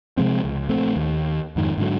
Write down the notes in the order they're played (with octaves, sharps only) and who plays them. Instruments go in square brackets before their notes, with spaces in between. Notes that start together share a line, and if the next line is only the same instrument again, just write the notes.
[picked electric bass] C3 F3 G#3 C4
C#2
A#1 A3 C4
D#2
F2 G#2 D#3
G#2 D3 F#3